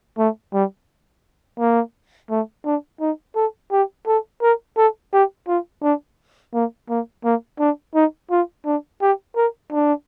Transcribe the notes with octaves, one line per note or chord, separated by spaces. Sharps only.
A3
G3
A#3
A3
D4
D#4
A4
G4
A4
A#4
A4
G4
F4
D4
A#3
A#3
A#3
D4
D#4
F4
D4
G4
A#4
D4